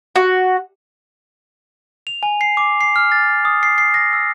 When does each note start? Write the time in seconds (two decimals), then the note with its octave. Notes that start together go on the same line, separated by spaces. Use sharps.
0.16 F#4
2.07 F7
2.23 G#5
2.41 C7
2.57 D6
2.81 C7
2.96 F6
3.12 A6
3.45 D#6
3.63 C7
3.78 C7
3.94 A#6
4.13 E6